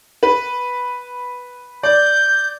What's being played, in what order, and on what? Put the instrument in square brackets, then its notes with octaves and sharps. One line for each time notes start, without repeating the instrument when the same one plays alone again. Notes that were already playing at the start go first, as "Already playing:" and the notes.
[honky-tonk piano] B4
[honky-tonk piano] D5 [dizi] G6